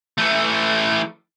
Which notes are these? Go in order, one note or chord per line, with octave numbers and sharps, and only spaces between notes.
E3 A3